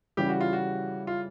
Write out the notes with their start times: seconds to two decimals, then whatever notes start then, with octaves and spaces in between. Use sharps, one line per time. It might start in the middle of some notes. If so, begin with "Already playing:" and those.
0.17 C#3 E3 G3 G4
0.29 F#4
0.41 F4
0.53 F#4
1.07 F4